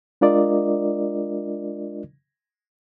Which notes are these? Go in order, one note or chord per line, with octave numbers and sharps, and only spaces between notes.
G#3 D4 F4 A#4 D5 D#5